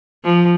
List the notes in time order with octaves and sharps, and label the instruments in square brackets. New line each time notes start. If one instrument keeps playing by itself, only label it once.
[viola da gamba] F3